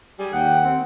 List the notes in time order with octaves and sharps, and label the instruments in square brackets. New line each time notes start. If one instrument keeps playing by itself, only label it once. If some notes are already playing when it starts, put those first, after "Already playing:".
[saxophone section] G3 G#4
[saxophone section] D#2 F#5 [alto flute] G5
[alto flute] C4